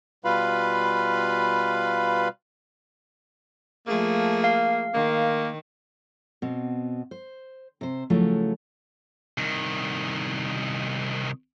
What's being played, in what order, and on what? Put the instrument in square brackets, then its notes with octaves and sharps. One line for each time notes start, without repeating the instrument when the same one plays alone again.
[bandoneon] B2 G3 F4 B4 F5 B5
[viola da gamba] F3 A3 G#4 [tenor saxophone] A#3
[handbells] F5
[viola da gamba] D#3 [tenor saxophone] A#3
[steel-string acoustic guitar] B2 B3 C4
C5
C3 C5
C#3 F3 F#3 A3 E4
[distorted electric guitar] C2 D#3